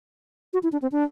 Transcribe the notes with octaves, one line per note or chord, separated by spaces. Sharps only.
F#4
E4
D4
C4
D4